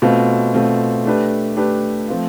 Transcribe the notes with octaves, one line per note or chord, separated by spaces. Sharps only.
B2 A3 C4 F4
B2 A3 C4 F4
A3 D4 G4 B4
A3 D4 G4 B4
F3 A3 C4 F4